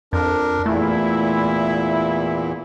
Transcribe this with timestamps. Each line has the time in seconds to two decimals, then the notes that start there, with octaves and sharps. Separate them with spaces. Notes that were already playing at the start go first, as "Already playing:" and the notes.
0.13 F2 D4 A#4
0.66 E2 A#2 A3 E4